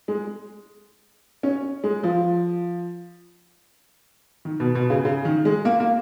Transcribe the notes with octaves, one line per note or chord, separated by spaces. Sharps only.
G#3
C#4
G#3
F3
D#3
B2
B2
C#3
C#3
D#3
G#3
A#3
A#3